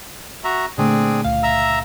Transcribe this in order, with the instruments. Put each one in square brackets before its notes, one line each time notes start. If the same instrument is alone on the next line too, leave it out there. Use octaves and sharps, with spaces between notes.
[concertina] F#4 E5 A#5
[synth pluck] A#2 D3 A3 [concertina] C4 D4 G#4
[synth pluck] C#2 F5
[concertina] E5 A#5 E6